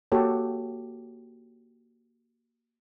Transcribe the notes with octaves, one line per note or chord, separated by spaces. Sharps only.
A#3 F#4 G4 A4 C#5